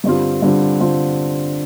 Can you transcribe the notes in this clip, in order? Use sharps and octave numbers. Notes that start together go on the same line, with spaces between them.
G2 D3 G3 C4 F4
G2 D3 G3 C4 F4
D3 G3 C4 F4